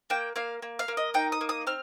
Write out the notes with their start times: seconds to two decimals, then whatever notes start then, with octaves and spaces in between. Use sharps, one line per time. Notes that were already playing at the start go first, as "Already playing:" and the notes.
0.10 A#3 G5
0.36 A#3 F5
0.62 A#3
0.79 F5
0.88 A#3
0.97 D#5
1.14 D#4 G5
1.32 D#6
1.41 A#3
1.49 D#6
1.67 C4 F6